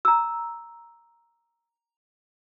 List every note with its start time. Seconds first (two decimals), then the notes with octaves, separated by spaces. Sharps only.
0.05 A#5 E6